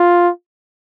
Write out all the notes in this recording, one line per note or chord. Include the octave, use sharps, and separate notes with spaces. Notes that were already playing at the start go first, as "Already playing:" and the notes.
Already playing: F4